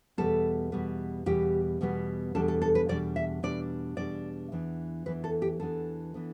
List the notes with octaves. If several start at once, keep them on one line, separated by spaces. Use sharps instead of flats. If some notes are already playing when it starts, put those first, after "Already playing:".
E2 B2 G3 B3 A4
E2 B2 G3 B3
E2 B2 G3 B3 G4
E2 B2 G3 B3
E2 B2 G3 D4 A4
A4
A4
B4
E2 B2 G3 D4 D5
E5
E2 B2 G3 D4 D5
E2 B2 G3 D4 D5
E2 E3 B3 D4
E2 E3 B3 D4 B4
A4
G4
E2 E3 B3 D4 A4
E3 B3 D4